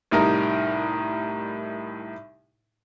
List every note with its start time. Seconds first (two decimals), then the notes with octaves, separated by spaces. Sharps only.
0.11 C2 A2 G3 D#4 A#4